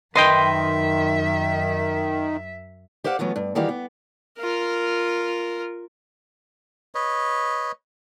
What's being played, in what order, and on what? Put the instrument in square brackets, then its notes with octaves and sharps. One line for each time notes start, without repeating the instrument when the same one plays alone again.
[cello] F#2 E5 [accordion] D#3 [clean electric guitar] B4 D#5 G5 [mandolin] C6
[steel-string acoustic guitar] G4 C5 D5 F5 F#5
E3 F#3 A3 B3 F4
G2
D#3 E3 G3 F#4 G4 F5
B3
[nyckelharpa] F4 A#4
[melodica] B4 C#5 D#5